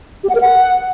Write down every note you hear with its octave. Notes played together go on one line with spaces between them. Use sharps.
G4
F#5
A#4
F#5